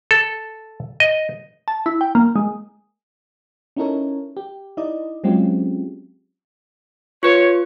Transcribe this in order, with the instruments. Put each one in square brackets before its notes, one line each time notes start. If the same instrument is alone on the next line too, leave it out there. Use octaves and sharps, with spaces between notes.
[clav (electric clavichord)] A4
D#5
[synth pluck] A5
E4
G5
A#3
G#3
[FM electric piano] C#4 D#4 E4 A4 A#4 C#5
G4
D#4 E4 D5 D#5
F#3 G#3 C4 C#4 F4 G4
[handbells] F4 B4 [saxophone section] C#5